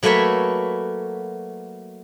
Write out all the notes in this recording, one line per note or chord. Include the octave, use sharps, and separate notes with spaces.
F#3 A3 A#3 B4 C#5 E5